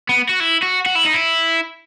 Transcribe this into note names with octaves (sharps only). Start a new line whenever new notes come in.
B3
F#4
E4
F#4
F#4
E4
D#4
E4